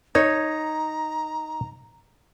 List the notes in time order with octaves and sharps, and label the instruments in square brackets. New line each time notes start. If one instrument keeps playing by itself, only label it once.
[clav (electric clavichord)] D#4 [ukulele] C#5 [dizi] A#5